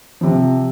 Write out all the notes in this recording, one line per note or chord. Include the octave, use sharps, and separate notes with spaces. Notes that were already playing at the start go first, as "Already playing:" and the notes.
C3 F3